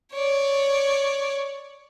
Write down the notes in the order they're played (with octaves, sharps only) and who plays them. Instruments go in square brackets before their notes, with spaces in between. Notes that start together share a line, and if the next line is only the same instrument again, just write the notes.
[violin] C#5 D5